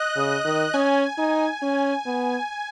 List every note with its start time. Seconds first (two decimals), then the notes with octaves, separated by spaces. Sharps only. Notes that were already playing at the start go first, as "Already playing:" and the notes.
Already playing: D#5 F#6
0.16 C#3
0.45 D#3
0.74 C#4 G#5
1.18 D#4
1.62 C#4
2.06 B3